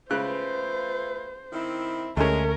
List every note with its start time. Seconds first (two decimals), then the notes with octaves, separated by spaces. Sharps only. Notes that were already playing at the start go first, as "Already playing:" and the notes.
0.11 C#3 A3 F4 B4 C5 F#6
1.53 D#3 C4 E4
2.17 D2 G#3 A3 C#4 A#4